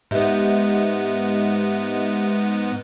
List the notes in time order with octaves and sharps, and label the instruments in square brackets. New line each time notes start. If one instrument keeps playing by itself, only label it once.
[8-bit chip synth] G#2 B3 [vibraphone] G4 D#5 E5